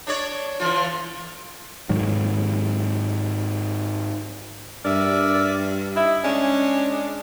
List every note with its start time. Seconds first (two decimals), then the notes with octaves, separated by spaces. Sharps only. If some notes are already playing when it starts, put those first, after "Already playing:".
0.07 D4 C#5 D5
0.60 D3 E3 F4
1.89 G#2 D#3 F#3
4.85 G2 A#4 D5 E5
5.95 D#4 E4
6.24 G#3 C#4 D4